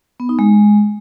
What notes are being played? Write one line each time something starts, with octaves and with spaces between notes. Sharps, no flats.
B3
D#4
G#3